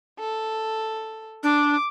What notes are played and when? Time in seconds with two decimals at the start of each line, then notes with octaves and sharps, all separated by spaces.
0.19 A4
1.43 D4 D6